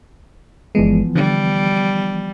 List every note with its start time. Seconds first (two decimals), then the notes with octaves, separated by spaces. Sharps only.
0.75 G1 E3 F3 G#3 B3
1.15 D3 G3